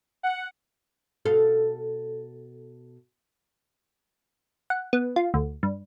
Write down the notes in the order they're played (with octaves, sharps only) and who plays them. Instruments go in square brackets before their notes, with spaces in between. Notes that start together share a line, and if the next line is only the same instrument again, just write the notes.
[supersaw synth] F#5
[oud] B2 A4 F5
[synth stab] F#5
B3
F4
D2
G2